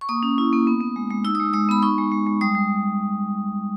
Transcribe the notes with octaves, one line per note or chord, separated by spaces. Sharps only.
C#6
A#3 D#6
C#4
E4
A#3
B3
B3
G#3
G#3
D#4 E6
G#3 D#6
G#3 D#6
B3 B5
D#4 C#6
G#3
G#3
G#3
G3 D#6
G3